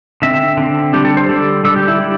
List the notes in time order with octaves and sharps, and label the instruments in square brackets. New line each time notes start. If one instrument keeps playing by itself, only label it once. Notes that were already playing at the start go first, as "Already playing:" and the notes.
[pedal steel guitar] D3 C4 E5
D3 C4
D3 G3 D4 G4
A4
C5
D3 G3 D4 A4
D3 G3 D4 A4
G4
E4
D3 G3 D4